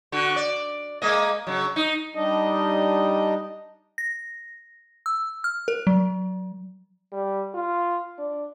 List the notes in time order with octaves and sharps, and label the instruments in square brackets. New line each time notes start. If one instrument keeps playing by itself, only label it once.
[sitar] D3 F#4
D5
G#3 A#3 D#5
C#3 F#3
D#4
[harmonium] G3 D4 D#4 D#5
[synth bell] A#6
E6
F6
A#4
F#3
[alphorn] G3
F4
D4